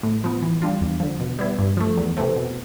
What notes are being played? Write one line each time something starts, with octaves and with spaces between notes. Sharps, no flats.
A2
F3 B3
E3
G3 D4 F4
E2
D3 F3
B2
G3 B3 E4
G2
F3 A3
E2
C3 E3 A3 C4
B2